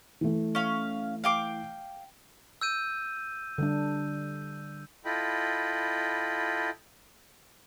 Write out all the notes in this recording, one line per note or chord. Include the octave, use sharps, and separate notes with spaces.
E3 A3
C#4 F5
F5 G5 D6
E6 G6 D#7
D3 G3 D4
E4 F4 A4 D#5 G5 B5